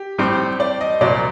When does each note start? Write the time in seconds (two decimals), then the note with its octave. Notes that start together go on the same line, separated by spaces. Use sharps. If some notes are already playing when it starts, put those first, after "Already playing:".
Already playing: G4
0.18 A2 G3 C4
0.60 D5
0.81 D#5
1.01 C2 A#2 F#3 D5